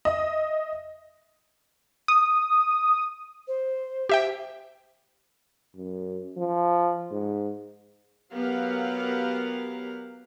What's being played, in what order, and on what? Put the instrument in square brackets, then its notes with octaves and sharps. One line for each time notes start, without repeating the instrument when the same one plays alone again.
[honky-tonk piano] D#5 E5
[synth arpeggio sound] D#6
[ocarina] C5
[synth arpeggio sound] G4 E5 G5
[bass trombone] F#2
F3
G#2
[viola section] F#3 B3 G4 A#4 F5 F#5